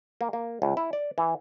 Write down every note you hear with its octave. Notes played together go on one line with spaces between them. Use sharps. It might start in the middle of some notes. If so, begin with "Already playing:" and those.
A#3
A#3
C#2
E4
D5
E3